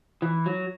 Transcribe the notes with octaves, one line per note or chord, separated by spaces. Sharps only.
E3
F#3